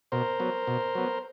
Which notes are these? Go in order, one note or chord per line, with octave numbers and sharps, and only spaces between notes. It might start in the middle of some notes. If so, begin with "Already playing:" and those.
B2 A#4 C5
F#3 B3
B2
F#3 B3